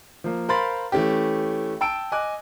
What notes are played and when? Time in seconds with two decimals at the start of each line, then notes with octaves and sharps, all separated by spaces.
0.24 F3 A#3
0.49 A#4 C5 F5 B5 C6 A6
0.92 E3 A3 C#4 G4
1.81 G5 A5 E6 D7
2.12 D#5 G#5 D6 F#6